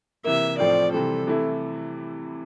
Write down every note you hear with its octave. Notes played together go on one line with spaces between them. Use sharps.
C3 E3 A#3 E5
A2 F3 C4 F4 D5
C3 E3 G3 C4 A4
C3 E3 A3 E4